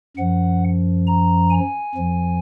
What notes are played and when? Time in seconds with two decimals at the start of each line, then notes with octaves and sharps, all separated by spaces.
0.17 F#2 F3 F#5
1.07 A#5
1.51 G#5
1.95 F2 F3